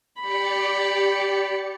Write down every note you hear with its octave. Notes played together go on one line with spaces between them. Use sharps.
G4 D5 B5 C#7